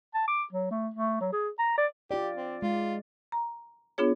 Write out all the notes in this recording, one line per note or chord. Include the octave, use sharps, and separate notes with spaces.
A5
D6
F#3
A3
A3
F#3
G#4
A#5
D5
F4 G4 D5
C4
G#3 F4
A#5
B3 D4 F4 G#4 C#5